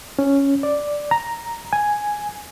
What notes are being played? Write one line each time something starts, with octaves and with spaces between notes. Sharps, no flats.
C#4
D5
A#5
G#5